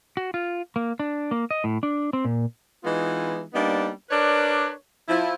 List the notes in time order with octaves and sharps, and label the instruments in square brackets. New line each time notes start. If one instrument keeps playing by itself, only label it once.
[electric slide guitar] F#4
F4
A#3
D4
A#3
D#5
A2
D4
C4
A#2
[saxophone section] E3 G#3 B3 D#4 F4
G3 A#3 B3 D4 D#4
D4 A#4 B4 C#5 D5
F3 E4